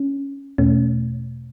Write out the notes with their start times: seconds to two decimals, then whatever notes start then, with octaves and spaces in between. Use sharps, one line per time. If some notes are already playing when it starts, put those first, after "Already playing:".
Already playing: C#4
0.58 E2 B2 A3 C#4